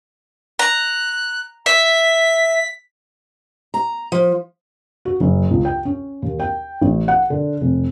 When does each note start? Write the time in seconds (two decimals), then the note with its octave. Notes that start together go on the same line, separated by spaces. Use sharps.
0.59 A#5 F#6
1.66 E5 B6
3.74 A#5
4.12 F3
5.05 F#4
5.20 F#1
5.51 C#2
5.65 G5
5.85 C#4
6.22 D#2
6.40 G5
6.82 A1
7.08 F#5
7.30 D3
7.61 F1